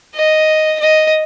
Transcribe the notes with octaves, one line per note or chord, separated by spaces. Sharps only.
D#5
D#5